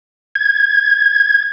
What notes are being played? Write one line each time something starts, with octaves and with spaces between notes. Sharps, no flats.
G#6